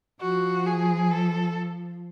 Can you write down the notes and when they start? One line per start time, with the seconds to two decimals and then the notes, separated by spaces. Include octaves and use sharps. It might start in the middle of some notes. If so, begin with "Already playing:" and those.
0.21 F3 F#4
0.66 G#4
1.11 A4